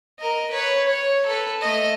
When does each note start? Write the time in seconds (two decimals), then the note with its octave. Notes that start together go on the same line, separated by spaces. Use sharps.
0.19 A#4 D#5
0.51 B4 C#5
0.86 C#5
1.26 A4 B4
1.61 A3 D#5